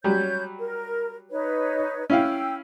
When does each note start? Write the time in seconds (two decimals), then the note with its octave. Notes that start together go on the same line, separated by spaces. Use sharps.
0.04 F#3 G3 C#4 G4 C#5 G6
0.59 A#4
1.31 D#4 B4 C#5
2.10 C#4 E4 F5 G5 E6